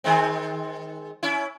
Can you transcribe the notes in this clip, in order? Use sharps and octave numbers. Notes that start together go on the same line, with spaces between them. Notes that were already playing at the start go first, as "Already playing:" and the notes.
D#3 G#3 C4
C#4 E4